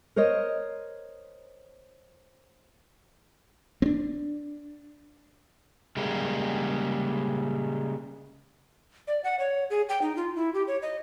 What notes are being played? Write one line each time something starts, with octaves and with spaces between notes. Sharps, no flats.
A#4 C5 C#5 D#5
C4 D4
C#3 G3 G#3 A#3
D5
F#5
C#5
G#4
G5
D#4
F4
E4
G4
C#5
D#5